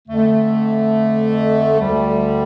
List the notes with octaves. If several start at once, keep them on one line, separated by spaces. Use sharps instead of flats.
F2 D3 A3
D2 D3 G3